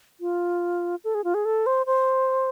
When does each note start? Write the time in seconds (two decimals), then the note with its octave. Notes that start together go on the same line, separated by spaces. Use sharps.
0.21 F4
1.04 A4
1.15 G#4
1.24 F4
1.34 G#4
1.45 A4
1.66 C5
1.86 C5